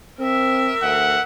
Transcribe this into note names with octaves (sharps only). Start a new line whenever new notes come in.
C4 A#4 E5
D2 F#5